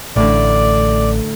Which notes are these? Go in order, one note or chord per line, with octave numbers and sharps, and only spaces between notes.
A1 A2 D3 D5